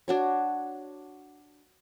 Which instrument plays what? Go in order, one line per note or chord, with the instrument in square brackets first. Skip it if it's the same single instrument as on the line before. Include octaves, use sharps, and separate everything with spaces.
[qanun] D4 F#4 C#5